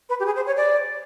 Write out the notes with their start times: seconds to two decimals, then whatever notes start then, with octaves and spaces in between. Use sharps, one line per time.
0.09 B4
0.20 G4
0.25 G#4
0.36 C5
0.46 C#5
0.57 D5